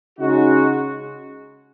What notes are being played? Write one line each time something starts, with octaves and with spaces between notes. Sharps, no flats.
C#3 G#3 D#4 F#4